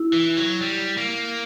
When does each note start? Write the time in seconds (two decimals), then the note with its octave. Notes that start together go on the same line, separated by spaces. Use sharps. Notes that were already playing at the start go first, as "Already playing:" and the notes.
Already playing: E4
0.13 E3
0.37 F#3
0.61 G3
0.98 A#3